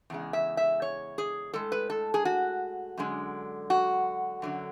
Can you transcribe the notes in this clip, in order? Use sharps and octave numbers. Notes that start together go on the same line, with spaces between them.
E2 C#3 G#3
E5
E5
C#5
G#4
A2 G#3 A4
B4
A4
G#4
F#4
F#2 D3 G#3
F#4
F#2 D3 F#3